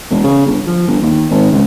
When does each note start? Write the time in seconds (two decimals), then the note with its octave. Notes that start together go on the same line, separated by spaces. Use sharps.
0.10 E1
0.24 C#3
0.46 G1
0.66 F3
0.88 G1
1.02 D#2
1.31 G#1
1.52 C#2